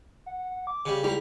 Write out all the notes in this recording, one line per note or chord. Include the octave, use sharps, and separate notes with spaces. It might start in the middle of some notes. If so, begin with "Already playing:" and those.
F#5
D6
C#3 G3
C#2 G3 E4 A#5